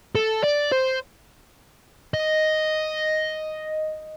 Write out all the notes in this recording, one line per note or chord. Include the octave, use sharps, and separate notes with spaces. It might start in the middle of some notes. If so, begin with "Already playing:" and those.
A4
D5
C5
D#5